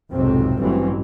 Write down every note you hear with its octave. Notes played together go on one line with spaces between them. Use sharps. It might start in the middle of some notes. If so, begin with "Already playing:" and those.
B1 F2 G#2 C3 C4
A1 G2 E3 F#3 C4